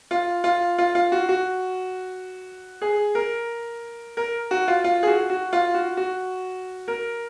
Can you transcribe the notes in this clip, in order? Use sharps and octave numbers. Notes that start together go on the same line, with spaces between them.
F4
F4
F4
F4
F#4
F#4
G#4
A#4
A#4
F#4
F4
F4
G#4
F#4
F#4
F4
F#4
F#4
A#4